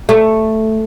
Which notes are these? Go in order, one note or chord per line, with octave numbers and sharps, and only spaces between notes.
A3